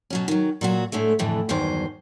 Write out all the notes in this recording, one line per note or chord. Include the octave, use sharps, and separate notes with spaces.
B2 F#3 C#4
D#3 F#3
A#2 F#3 F#4
A2 D3 G#3 A3
F2 A2 D3 E3
E2 G2 D#3 F#3 C5